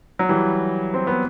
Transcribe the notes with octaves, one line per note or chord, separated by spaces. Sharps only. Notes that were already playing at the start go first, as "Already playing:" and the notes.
F#3
E3 G3
C4
B3